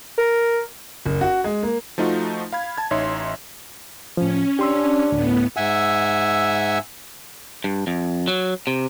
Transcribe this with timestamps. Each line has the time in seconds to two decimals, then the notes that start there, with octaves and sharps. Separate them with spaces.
0.18 A#4
1.06 F#1
1.21 F#4
1.44 G#3
1.63 A#3
1.98 F3 A3 D#4 F4 F#4
2.53 F5 B5 G#6
2.78 A5 G#6
2.91 A1 D#4 C#5 E5 C6
4.17 A2 F3 C#4
4.59 D4 G4 C6 E6
5.12 D2 A2 B3
5.57 G#2 E5 F#5 G#5 E6
7.64 G2
7.87 F2
8.28 F#3
8.67 C3